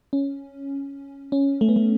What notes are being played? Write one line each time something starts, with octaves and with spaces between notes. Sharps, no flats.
C#4
C#4
A3
B3
A3